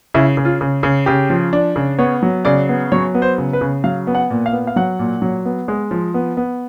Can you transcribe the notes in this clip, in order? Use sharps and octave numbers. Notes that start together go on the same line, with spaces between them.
C#3 E4
C#3
F4
C#3
C#3
C#3 G4
F3
D4
C#3
B3 C#5
F#3
C#3 D5
B3
F#3 C#5
B3
C5
C#3
B4
C#3
F#3 F5
B3
F#5
A#2
F5
B3
F5
F#3 F#5
A#2
F#3
B3
G#3
F3
B3
B3